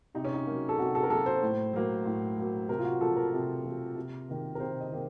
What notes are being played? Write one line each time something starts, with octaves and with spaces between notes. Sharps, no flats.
C3 D#4
C#4
D#4
F#3 A#3
A4
C3 F#4
A4
A#4
F#3 A#3 A4
C5
A2
F#3 A#3
A2
F#3 A#3
C3 A#4
F4
F#4
F3 A#3 A4
A#4
C3
F3 A#3
C3
D#3 A#3
A#4
C3 C5
D#5
D#3 A#3